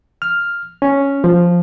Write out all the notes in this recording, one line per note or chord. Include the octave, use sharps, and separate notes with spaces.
F6
C#4
F3